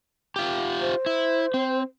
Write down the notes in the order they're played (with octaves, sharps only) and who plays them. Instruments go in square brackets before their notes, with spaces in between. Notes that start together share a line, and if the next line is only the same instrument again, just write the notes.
[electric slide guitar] F4 G4
[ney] C5
[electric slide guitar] E4
C4